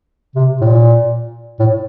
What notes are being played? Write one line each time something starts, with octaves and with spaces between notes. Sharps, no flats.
C3
A2
A#2
A2